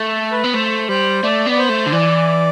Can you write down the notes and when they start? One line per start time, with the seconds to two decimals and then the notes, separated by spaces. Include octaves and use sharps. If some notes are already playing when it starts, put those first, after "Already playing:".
Already playing: A3
0.08 A4
0.32 B4
0.44 B3
0.54 A3 C5
0.89 G3 C5
1.23 A3 D5
1.47 B3 D5
1.59 C5
1.69 A3
1.87 D3
1.93 E3 D5